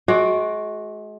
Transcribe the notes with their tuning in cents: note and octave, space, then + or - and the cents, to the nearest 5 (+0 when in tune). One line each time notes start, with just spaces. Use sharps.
G#3 +35 F#4 +0 D5 +0